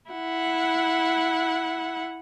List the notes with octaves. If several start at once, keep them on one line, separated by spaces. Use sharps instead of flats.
E4 F#5